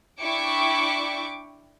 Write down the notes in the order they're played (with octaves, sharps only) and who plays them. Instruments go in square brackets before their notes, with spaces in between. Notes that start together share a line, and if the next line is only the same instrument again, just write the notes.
[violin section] D4 E4 G5 C#6 D6